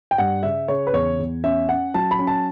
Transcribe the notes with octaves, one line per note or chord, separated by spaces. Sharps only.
G5
G2 F#5
C#3 E5
C#3 C#5
B4
E2 C#5
E2
C#4 E5
C#4 F#5
F#3 A5
B5
C#4
A5